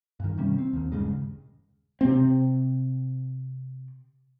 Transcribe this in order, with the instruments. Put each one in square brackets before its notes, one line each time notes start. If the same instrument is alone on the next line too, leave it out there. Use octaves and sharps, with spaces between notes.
[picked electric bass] G2 D#3
C3 D#3 G3 C#4
C4
D#2 D#3
D#1 G2 C#3 G#3
[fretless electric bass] C3 C4